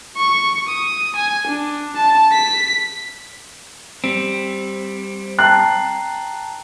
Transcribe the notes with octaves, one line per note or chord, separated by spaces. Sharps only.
C#6
D#6
G#5
D4
A5
B6
G3 C4
G5 A5 A#5 F#6 C7